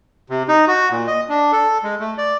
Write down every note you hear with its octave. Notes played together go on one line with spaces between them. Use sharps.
C3
D#4
F#4
A#2
D#5
D4
A4
G#3
A3
D5